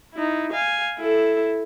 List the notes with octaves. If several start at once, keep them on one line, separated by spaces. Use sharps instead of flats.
D#4 E4
F5 G#5
E4 A4